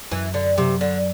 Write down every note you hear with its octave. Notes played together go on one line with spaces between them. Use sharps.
F#2 E3
D3
C3 F#3
D3